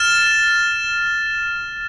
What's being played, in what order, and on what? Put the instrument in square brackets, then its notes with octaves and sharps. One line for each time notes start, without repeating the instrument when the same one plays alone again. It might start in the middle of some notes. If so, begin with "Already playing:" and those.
Already playing: [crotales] F6 A6 E7